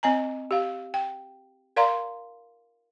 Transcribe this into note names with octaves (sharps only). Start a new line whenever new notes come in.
C4 D#5 G#5 A#5
G4 F5
G5
A#4 D5 F5 A#5 C6